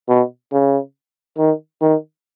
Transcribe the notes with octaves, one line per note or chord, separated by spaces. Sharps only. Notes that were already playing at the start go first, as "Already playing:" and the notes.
B2
C#3
D#3
D#3